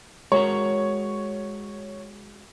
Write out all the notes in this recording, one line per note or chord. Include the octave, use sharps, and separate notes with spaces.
G#3 F#4 A#4 C#5